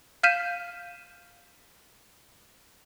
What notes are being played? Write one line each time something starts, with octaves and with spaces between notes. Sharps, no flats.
F5 F6 G6 B6 D#7 E7